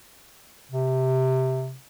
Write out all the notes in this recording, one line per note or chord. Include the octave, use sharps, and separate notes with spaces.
C3